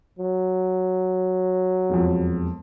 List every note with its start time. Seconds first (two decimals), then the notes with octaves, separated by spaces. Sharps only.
0.19 F#3
1.90 E1 F2